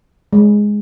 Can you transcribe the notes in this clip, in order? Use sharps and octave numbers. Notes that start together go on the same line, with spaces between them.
G#3